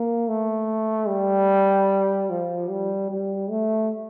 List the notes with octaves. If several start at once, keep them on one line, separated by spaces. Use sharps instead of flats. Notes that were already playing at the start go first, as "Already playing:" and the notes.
Already playing: A#3
A3
G3
F3
G3
G3
A3